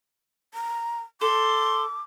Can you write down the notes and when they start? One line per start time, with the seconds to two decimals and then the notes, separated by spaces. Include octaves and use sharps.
0.54 A#5
1.21 A4 C6 D6